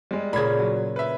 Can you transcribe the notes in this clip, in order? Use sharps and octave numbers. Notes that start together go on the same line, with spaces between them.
G3 G#3
A#2 C#3 B5 G#6
F#3
B4 E5